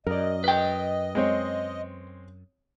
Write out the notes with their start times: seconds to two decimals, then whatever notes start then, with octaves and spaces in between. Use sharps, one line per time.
0.07 F#2 A#4 D5 D#5
0.44 B4 G5
1.15 G#3 C4 C#5